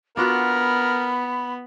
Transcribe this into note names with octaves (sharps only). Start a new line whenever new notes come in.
B3 D4 F4 F#4 A#4 B5